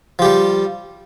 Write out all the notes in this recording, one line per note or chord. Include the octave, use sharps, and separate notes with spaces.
F3 G3 G4